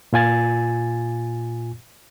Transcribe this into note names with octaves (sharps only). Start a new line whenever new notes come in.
A#2 F4 G#5 A6